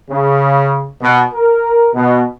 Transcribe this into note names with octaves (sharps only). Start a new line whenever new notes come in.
C#3
B2
A#4
B2